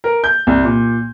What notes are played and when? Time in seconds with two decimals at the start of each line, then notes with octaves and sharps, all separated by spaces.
0.04 A#4
0.24 G6
0.47 C2
0.64 A#2